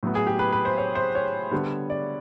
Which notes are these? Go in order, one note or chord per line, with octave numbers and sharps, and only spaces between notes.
A2 F#3 B3
G#4
G4
B4
B4
C5
C#5
C5
C#5
D3 G3 B3
D5